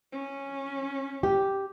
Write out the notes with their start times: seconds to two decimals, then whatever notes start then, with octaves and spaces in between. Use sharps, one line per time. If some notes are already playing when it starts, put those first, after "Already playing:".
0.12 C#4
1.23 G4